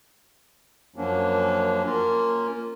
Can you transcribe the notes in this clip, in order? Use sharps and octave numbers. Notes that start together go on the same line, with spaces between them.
F#2 F3 F#3 A#3 C#4 D4
A#3 C#4 F4 A#4